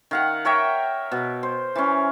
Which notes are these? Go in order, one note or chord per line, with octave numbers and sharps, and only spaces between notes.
D#3 F5 F#5
A#4 C#5 E5 G5
B2
C5
E3 C#4